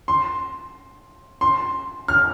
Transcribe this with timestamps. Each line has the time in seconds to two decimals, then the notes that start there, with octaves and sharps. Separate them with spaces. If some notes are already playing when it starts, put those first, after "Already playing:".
0.08 C6
1.41 C6
2.08 F6